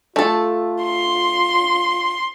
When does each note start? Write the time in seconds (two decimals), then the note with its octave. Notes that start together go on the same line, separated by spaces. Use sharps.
0.16 A3 F4 A4
0.83 C6